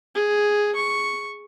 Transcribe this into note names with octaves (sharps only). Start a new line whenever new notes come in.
G#4
C#6